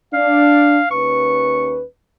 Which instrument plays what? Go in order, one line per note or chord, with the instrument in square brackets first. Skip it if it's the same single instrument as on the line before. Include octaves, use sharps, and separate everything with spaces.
[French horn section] D4 [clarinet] F5
[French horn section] D#2 C#4 B4 [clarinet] C#6